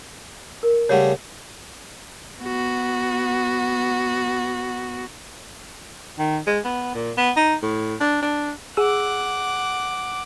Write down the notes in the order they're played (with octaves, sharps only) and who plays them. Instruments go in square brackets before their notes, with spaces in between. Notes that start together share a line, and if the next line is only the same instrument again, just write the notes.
[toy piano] A#4
[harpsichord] C#3 G3 A3 [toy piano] C#5 F#5
[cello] B3 F#4
[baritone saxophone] D#3
G#3
B3
A#2
B3
D#4
A2
D4
D4
[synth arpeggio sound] G#4 E6 [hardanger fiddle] F#5 D6